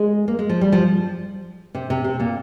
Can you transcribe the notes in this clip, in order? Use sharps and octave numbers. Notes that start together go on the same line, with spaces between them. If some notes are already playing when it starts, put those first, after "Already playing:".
Already playing: G#3
A#3
G#3
F3
G3
F3
C3
C3
C3
A#2